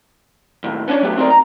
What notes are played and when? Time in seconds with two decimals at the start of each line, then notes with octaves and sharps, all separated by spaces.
0.64 D#2 A2
0.88 B3 C#4 D4 C#5 D5
1.02 F#3 A3 B3 G4
1.17 A3 C4 D#4 A4 A#4 D5
1.30 A#5